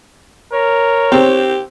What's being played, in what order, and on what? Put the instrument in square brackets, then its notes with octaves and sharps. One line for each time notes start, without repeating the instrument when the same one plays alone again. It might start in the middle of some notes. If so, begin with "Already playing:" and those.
[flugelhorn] A#4 [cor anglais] C#5
[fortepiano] C4 [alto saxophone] G4